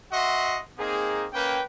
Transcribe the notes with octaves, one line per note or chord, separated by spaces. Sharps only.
F#4 D#5 E5 F#5 C6
A#3 C4 D#4 G#4
A#3 C#4 B4 G5